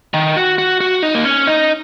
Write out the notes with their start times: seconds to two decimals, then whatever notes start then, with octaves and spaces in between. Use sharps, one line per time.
0.14 D#3
0.36 F#4
0.58 F#4
0.81 F#4
1.02 D#4
1.15 A#3
1.25 C#4
1.47 D#4